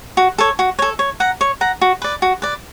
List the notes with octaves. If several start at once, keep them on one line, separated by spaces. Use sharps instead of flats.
F#4
A4 C#5
F#4
A4 C#5
C#5
F#5 A#5
C#5
F#5 A#5
F#4
B4 D5
F#4
B4 D5